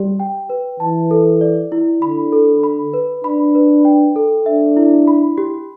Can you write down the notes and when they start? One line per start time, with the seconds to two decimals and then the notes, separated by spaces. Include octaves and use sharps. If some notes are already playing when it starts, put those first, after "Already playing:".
Already playing: G3 G4
0.20 G5
0.50 B4
0.80 E3 A5
1.11 A4
1.41 D5
1.72 E4
2.02 D3 B5
2.33 A4
2.63 B5
2.94 B4
3.24 D4 B5
3.55 B4
3.85 G5
4.16 A4
4.46 D4 E5
4.77 E4
5.08 B5
5.38 G4